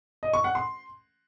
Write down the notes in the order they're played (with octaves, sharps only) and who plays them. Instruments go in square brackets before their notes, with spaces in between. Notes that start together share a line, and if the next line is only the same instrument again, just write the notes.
[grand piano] D#5
C#6
F#5
C6